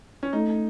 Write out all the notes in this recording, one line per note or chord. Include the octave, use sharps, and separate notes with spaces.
C#4
A3 D#4